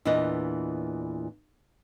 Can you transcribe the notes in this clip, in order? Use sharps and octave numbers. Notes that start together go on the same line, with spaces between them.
E2 A#2 E3 D4 B4 D#5